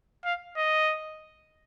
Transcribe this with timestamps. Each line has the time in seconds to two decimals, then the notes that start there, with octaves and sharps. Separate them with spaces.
0.25 F5
0.57 D#5